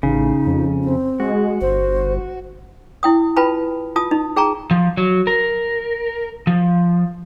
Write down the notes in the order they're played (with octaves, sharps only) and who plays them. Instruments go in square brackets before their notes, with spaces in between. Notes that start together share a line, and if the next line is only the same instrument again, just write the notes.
[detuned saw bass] A1 [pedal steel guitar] C#3 [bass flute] D#4
[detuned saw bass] F2
[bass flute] C4
[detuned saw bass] G#3 [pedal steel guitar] F#4
[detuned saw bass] G1 [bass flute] C5
[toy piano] E4 G5 D#6
F4 B4 G5 A5 B5
F4 A5 D#6
D#4
G#4 G5 A5 A#5 C#6
[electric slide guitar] F3
F#3
A#4
F3